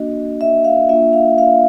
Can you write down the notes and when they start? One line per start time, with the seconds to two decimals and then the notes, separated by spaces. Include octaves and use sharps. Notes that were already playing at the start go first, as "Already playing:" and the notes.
Already playing: A#3 D4 F#4 D#5
0.41 E5
0.65 F5
0.89 A#3 D4 F4 E5
1.13 F5
1.38 F5